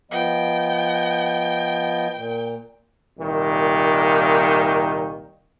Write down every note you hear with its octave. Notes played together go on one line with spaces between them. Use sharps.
F3 B3 D#5 G5
A#2
C2 A#2 D#3